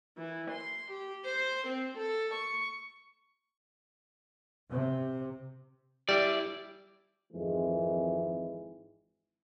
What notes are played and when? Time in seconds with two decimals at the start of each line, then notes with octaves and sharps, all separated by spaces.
0.18 E3
0.51 C6
0.91 G4
1.25 C5
1.68 C4
1.98 A4
2.34 C#6
4.71 C3
6.09 G3 E4 D5
7.33 G#1 F2 D#3 E3 G#3